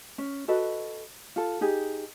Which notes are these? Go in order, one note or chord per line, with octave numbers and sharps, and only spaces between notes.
C#4
F#4 A4 B4 D#5
F4 A4
D#4 G4 G#4